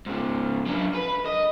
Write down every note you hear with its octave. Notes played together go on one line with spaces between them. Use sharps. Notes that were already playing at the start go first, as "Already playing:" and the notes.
G#2 C#3
F#3 D4
B4
D#5